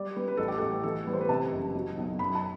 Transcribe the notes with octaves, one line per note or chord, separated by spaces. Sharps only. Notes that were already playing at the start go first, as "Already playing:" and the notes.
Already playing: G3 D5
G3 B4
B4
A1 A4
G4
A1 A4
E3 A4
G3 B4
C5
B4
C3 A5
F#1
F#3
B1
F#2 B5
A5